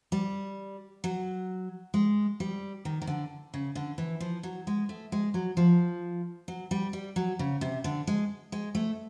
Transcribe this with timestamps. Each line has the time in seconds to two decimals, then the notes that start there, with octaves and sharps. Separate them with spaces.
0.12 G3
1.04 F#3
1.94 G#3
2.40 G3
2.85 D#3
3.02 D#3
3.07 D3
3.54 C#3
3.75 D3
3.98 E3
4.20 F3
4.43 F#3
4.67 G#3
4.89 A3
5.12 G#3
5.34 F#3
5.57 F3
6.48 F#3
6.71 G3
6.93 G3
7.16 F#3
7.39 C#3
7.61 C3
7.84 D3
8.07 G#3
8.52 G#3
8.75 A3